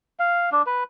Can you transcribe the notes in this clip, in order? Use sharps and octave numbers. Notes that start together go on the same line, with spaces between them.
F5
D4
B4